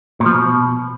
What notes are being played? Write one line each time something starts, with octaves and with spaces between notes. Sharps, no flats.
A#2
F3
B2